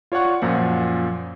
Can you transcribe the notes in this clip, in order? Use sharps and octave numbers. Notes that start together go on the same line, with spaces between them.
F4 C#5 D5 F#5 C#6
F#2 A#2 F3 F#5